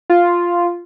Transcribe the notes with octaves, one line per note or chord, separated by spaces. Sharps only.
F4